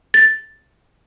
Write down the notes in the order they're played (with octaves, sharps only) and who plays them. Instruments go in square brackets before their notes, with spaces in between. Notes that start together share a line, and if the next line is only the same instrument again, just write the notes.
[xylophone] A6